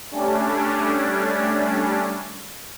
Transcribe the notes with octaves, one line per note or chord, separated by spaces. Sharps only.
G3 A3 C#4 D4